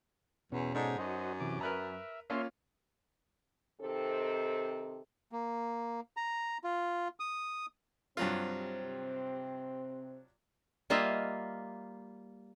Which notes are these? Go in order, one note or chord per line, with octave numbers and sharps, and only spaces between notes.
E2 B2 C#4
G#2 D#4 A4 D5
F#2 F#4 C5 D#5
C3 E3 D6
A#4 B4 E5 A#5
A#3 C#4 F4 C#5 E5 C6
C3 D#3 C4 D#4 A4
A#3
A#5
F4
D#6
G2 C3 F#3 C4 F4
G3 A#3 F4 D#5 E5